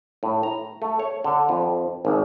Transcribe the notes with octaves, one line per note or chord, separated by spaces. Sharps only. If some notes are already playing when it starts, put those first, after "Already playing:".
A2
A#5
A3
C#5
D3
F2
G#1